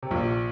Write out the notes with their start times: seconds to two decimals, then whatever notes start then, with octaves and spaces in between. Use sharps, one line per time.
0.03 C3
0.11 A#1 A#2